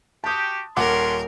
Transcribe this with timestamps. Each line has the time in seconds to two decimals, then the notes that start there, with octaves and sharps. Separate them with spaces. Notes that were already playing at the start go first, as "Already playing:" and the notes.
0.24 F#4 G4 A5 D#6
0.77 D#1 C#4 D4 A#4 F#5 C6 D6